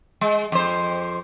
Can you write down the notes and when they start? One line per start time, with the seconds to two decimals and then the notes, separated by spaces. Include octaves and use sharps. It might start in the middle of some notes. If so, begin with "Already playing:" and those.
0.21 G#3
0.52 F2 C5